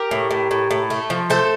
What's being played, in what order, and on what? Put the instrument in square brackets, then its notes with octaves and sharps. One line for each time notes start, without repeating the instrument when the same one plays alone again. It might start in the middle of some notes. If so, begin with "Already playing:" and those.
Already playing: [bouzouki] G4 A#4
A2
A2
A2
A2
A3
F3
A3 A4 C5